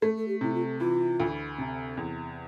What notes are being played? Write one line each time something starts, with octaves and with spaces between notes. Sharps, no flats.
A3 A4
A4
G4
C3 E4
F4
E3 F4
D2
C3
E2